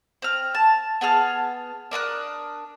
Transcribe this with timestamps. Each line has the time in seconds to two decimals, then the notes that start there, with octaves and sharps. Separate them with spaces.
0.22 C4 F6
0.55 A5
1.01 B3 G#4 A5 F6
1.91 D4 A#4 D#6 F#6